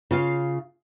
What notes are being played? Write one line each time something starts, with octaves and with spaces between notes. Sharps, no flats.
C#3 F4 F5